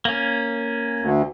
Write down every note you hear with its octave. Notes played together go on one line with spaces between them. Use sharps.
A#3 C#4
D2